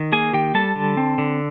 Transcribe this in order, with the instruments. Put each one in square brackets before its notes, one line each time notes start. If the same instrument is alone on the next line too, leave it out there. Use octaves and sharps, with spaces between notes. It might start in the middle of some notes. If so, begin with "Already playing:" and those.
Already playing: [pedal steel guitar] D#3
A#3 G#4 G#5
D#3 G4 G5
G3 A4 A5
D3
C4
D3